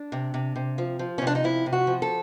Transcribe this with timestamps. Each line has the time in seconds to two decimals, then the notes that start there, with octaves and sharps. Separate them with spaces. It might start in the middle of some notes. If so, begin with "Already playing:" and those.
Already playing: D4
0.12 C3
0.34 C3
0.56 C3
0.78 F3
0.99 F3
1.18 C#4
1.22 C3
1.27 D4
1.35 D#4
1.44 F3 E4
1.66 C3
1.73 F#4
1.87 F3
2.02 A4